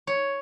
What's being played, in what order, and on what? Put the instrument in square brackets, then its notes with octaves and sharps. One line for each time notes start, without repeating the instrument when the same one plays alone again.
[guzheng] C#5